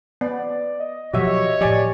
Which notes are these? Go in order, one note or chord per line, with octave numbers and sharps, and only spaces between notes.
B3 D5
D#5
B2 F3 F#3 F#4 G4 C#5 E5
A2 F3 G4 D5 G#5